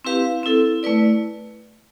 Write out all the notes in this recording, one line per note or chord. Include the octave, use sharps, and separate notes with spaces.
C4 E4 G4 B4 F5
C4 E4 A4
A3 E4 B4 D5